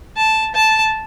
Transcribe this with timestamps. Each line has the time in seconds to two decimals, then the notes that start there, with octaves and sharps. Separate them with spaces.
0.17 A5
0.55 A5